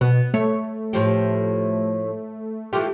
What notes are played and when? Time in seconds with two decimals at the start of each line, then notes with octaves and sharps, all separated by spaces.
0.01 B2 B3
0.34 A3 C#5
0.93 A2 F3 G4
2.73 E3 A3 F4 G4